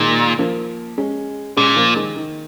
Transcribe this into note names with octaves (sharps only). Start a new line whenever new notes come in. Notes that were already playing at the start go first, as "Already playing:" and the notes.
Already playing: A#2 D#3 G#3
F3 A#3
G#3 C#4
A#2 G#3 C#4
F3 A#3
D#3 G#3
D#3